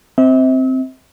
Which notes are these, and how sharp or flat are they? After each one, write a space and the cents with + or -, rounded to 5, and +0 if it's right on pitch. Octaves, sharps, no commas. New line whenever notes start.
C4 +0 E5 -40